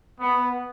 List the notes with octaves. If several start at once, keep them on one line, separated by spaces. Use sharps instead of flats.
B3